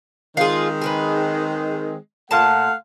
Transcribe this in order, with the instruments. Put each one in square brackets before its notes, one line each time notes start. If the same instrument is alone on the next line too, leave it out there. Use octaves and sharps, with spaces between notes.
[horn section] D#3 G#3 C4 [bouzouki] F4 G#4
[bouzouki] G#4 A#4 B4
[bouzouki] A#2 A5 [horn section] A3 F5 F#5